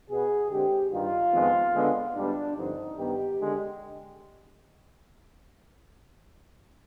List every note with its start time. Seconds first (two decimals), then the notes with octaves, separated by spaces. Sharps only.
0.09 B2 B3 G#4
0.50 D3 G#3 C4 G4
0.92 G2 D#3 G3 F4
1.33 F2 D#3 G#3 B3
1.75 D3 G#3 B3
2.15 G#2 G3 B3 D4
2.56 G2 D3 F3 C4 D#4
2.98 G2 D#3 B3 G4
3.40 D3 G#3